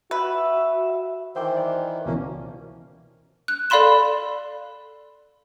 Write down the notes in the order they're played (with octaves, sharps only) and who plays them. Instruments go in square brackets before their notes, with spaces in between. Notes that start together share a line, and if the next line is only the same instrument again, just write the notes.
[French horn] F#4 [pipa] B4 [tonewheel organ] E5
[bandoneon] D#3 E3 [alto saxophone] C5 [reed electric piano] E5 G5 D6
[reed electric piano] D5
[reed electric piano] C#2 B2 E3 [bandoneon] F3 A#3 C#4
[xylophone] F#6
A4 D5 F5 B5 C6 E7